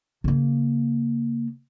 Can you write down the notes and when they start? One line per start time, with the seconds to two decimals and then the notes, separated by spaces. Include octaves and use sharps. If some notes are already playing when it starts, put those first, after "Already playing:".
0.24 C#3 A#3